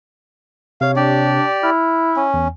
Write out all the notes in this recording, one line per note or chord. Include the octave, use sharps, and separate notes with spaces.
C3 C#5 F5
D4 G4 D5
E4 F6
C#4
E2